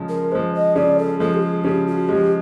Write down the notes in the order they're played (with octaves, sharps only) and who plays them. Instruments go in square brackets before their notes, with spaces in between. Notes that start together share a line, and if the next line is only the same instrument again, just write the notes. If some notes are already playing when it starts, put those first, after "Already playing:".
Already playing: [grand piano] C#3 F3 G#3
[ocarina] A#4
[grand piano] F3 G#3 [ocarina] C5
[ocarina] D#5
[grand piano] C#3 [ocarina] D5
[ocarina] A4
[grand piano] F3 G#3 [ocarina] A4
[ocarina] G4
G#4
[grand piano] C#3 [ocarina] G4
[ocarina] F#4
[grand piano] F3 G#3 [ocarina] G4